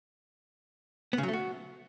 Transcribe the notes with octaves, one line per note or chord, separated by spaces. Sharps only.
B3
C#3
F#3
A3
F#4